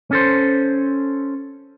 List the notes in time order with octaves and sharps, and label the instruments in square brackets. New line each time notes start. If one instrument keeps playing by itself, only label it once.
[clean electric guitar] C#4 A4 C5